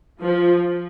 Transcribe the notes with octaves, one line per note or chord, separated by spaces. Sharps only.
F3